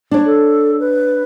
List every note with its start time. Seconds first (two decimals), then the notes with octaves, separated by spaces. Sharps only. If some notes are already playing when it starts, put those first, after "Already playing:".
0.11 D4 C#5
0.26 A4
0.80 B4